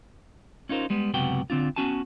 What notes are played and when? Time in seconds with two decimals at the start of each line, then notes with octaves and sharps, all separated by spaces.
0.69 C#4 D#4 F4 A#4 C5
0.90 G3 G#3 B3
1.14 C#2 F#2 C3 B3 F#4 G5
1.50 D3 C4 D4 F4
1.76 B3 C#4 F#4 G#5 A5